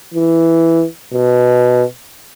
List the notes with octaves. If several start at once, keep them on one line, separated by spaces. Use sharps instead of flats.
E3
B2